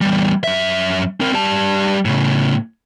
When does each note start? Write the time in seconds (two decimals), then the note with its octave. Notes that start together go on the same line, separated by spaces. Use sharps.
0.01 E2 G3
0.44 F#2 E5
1.20 C4 A#4
1.34 G3 A5
2.05 A2 C#3